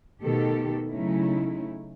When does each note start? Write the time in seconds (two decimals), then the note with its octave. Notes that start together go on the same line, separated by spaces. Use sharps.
0.22 B2 D#3 A3 G4 A4
0.90 C#3 F#3 A3 C#4 D#4 E4